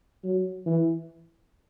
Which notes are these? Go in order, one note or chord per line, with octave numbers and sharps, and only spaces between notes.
F#3
E3